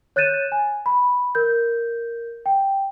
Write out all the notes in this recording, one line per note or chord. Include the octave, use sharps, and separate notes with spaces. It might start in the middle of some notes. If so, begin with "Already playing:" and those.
C#5 F#6 G6 A6 D#7 E7
G#5
B5
A#4 G6
G5